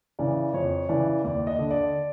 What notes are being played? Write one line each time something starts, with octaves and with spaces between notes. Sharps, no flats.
C#3 E3 D5
F2 C#5
C#3 E3 D5
D#2 D5
D#5
D3
D5